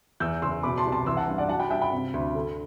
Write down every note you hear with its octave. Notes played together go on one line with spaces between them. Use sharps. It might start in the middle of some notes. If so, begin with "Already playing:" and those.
E2 E6 G6
F#1 C6 E6
B2 B5 D6
A5 C6
C2
A5 C6
E3 C6 E6
F#5 A5
G2
D5 F#5
F#3 F#5 A5
G5 B5
G2 E5 G5
G5 B5
C3
D2
D3